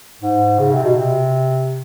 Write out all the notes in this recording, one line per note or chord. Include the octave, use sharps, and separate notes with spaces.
G#2
C#3
C3
B2
C3